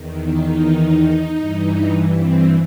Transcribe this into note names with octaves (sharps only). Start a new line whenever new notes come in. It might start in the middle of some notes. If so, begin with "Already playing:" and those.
Already playing: E2 D#3
D#4
G2 E3
C4